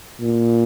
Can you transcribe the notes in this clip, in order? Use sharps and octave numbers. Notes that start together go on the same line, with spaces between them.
A#2